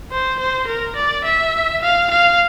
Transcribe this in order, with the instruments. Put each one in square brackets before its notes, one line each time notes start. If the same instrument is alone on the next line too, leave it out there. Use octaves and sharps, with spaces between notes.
[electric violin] C5
C5
A#4
D5
E5
F5
F5